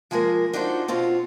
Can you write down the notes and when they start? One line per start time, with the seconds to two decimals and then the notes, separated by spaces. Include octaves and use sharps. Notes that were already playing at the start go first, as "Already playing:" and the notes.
0.11 F3 G#3 A#3 G#4 A#4
0.53 D4 D#4 F4 F#4 A4 C5
0.88 B2 C4 F4 C#5